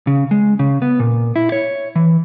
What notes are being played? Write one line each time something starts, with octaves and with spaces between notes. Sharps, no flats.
C#3
G#3
C#3
B3
A#2
E4
C#5
E3